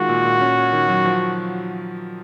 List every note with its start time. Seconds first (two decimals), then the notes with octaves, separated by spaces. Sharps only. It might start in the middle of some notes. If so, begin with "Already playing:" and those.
Already playing: D#3 G#3 F4 F#4
0.09 A#2
0.25 A#2
0.41 C#4
0.57 C#4
0.73 D#3
0.89 F#3
1.05 F3